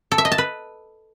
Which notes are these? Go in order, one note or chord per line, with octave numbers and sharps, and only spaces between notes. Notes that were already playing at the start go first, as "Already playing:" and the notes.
A4
E5
D#5
A5
B4